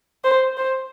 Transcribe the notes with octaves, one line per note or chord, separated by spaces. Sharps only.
C5
C5